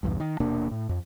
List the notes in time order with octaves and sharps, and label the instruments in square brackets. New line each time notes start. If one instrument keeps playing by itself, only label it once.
[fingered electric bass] B1 E2 G2
D#3
D#1 B2 A#3 D4
A2
F2